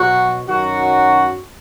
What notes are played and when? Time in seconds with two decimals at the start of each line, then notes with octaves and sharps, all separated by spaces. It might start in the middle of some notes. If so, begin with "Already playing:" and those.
Already playing: B2 F#3 F#4
0.46 F#2 D#3 F#3 F#4